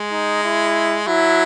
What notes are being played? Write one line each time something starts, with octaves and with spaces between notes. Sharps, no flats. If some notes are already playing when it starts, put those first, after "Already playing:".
Already playing: G#3
D#4
E4
F#3 E4